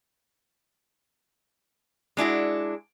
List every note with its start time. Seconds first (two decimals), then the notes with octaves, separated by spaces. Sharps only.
2.17 G#3 D4 E4 F#4